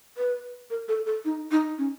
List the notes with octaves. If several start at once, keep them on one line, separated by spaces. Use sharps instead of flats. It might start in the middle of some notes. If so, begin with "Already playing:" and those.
B4
A#4
A4
A4
D#4
D#4
C#4